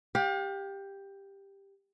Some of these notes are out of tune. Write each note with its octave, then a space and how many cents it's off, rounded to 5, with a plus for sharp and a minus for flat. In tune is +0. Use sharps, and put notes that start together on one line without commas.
G4 +10 F5 +40